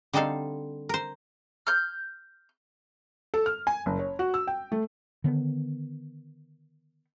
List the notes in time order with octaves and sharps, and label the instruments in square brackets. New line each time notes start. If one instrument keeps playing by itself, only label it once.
[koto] D3 G3 C4 D#4 A4 F5
A#4 C5
[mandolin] F6 G6
[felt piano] A4
F6
G#5
F#1
C#5
F#4
E6
G5
A3
[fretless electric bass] D3 D#3 B3